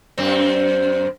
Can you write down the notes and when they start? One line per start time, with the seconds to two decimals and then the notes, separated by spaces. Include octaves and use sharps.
0.18 F#2 C4